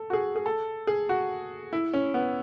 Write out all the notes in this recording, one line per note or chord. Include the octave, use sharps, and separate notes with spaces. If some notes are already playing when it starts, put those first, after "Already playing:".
Already playing: A4
F#4
G#4
G#4
A4
G#4
F#4
E4
C#4
B3